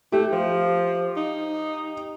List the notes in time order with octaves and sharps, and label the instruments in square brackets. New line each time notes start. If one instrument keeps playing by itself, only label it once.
[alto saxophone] A3 [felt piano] G4
[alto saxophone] F3
D#4